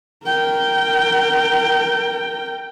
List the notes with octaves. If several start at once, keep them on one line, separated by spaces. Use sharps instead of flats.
A#4 G5